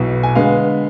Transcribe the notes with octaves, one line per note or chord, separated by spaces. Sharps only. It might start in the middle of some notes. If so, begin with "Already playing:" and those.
Already playing: B1 B2 B3 E4
G#5
D3 G#3 B3 F5